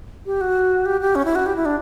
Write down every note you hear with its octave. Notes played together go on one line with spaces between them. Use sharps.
G4
F#4
G4
G4
C#4
E4
F#4
G4
E4
D4